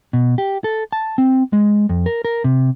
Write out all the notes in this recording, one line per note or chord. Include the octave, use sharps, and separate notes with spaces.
B2
G4
A4
A5
C4
G#3
F2
A#4
A#4
C3